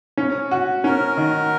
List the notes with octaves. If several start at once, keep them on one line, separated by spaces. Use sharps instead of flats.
C#4
F#4
C#4 A#4
D#3